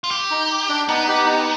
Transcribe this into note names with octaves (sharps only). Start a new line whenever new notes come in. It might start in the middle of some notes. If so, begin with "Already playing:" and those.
F4
G4
D#4
D4
B3 D#4
D#4 G4
D#4